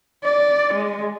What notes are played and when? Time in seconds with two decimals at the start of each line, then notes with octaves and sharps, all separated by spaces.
0.24 D5
0.74 G#3